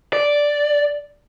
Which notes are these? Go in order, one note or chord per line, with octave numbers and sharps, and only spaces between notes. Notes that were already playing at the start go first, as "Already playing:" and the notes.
D5